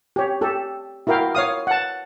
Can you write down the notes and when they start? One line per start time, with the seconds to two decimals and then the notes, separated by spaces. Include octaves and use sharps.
0.16 G4 C#5
0.41 G4 A4
1.07 E4 F#4 A#4 F5 G5
1.35 C#5 F5 D#6
1.67 F#5 A5